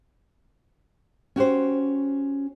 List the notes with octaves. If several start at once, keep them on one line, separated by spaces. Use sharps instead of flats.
C#4 F#4 G4 C5